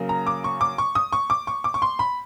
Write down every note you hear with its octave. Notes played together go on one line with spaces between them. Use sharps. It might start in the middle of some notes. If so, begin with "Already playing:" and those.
Already playing: C#3 F#3 A#3
A#5
D6
C#6
D6
C#6
D#6
C#6
D6
C#6
D6
C#6
C6
B5